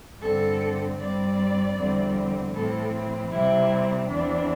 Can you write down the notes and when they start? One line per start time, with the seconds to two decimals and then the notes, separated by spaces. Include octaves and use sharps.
0.21 G2 D3 C4 A4
0.98 G2 G3 C4 D5
1.76 E2 D3 G3 C4
2.53 A2 E3 C4 A4
3.31 C3 G3 C4 E4
4.08 E2 E3 C4 D4